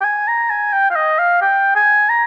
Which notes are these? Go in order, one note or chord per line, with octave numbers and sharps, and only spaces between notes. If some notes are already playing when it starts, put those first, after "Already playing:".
G5
G#5
A#5
G#5
G5
F5
D#5
F5
G5
G#5
A#5